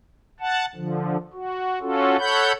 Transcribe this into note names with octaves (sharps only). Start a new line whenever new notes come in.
F#5 A5
D3 F3
F#4
C#4 F4 F#4 A4
A4 C#5 F#5 B5 G6